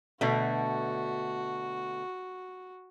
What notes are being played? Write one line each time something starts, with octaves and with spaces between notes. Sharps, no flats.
B2 D3 A3 F#4